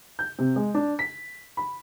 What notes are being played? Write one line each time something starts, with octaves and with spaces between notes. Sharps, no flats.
G6
C3
G#3
D4
B6
B5